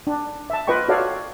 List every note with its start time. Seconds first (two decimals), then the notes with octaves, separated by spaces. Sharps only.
0.07 D4
0.50 E5 A5
0.67 F4 B4 D#5 G5 C#6
0.88 F#4 A4 C#5 D5 F5